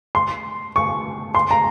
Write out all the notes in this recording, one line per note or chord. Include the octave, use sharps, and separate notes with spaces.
C6
C#6
C6
A#5